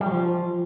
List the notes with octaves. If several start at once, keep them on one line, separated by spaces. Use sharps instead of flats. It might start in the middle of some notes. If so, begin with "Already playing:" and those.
G3
F#3
F3